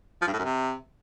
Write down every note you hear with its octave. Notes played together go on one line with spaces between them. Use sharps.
F3
G2
A2
F#2
C3